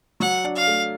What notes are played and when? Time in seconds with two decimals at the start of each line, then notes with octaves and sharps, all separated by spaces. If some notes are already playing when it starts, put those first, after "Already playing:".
0.20 F#3 F#5
0.44 D4
0.56 F5
0.68 A3